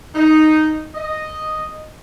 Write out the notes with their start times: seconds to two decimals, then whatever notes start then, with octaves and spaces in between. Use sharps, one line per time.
0.15 D#4
0.95 D#5